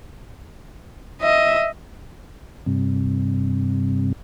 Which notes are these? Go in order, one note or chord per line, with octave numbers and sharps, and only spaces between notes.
D#5 E5
G2 C3